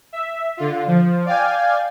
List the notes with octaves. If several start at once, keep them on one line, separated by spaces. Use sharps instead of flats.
E5
D3 F4
F3
D5 F5 G5 G#5